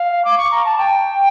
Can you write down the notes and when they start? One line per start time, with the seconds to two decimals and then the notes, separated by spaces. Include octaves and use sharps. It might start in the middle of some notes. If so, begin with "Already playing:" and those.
Already playing: F5
0.24 D6
0.37 C#6
0.51 A#5
0.65 A5
0.78 G5